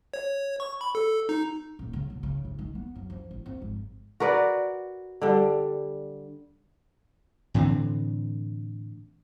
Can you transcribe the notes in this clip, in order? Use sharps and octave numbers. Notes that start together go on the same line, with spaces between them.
C#5
C#6
B5
A4
D#4
D#1
C#3
B2
C#3
C3
D#3
B3
F#2
F3
A1
F2
G#1
F#4 A#4 B4 D5
D3 G3
A2 D3 E3 C4